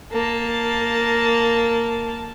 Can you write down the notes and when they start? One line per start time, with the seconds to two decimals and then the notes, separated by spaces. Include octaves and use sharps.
0.12 A#3 A5